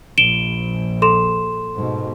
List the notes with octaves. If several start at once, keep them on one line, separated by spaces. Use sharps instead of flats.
A#1 D7 E7 G7
A4 C6 E7
G#2 B2